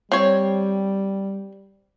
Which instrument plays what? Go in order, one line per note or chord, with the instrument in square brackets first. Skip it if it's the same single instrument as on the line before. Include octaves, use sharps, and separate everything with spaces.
[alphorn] G3 [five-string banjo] C4 C#5